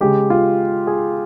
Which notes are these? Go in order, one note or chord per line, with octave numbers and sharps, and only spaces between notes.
C#3 G#3 G4
F4
G#4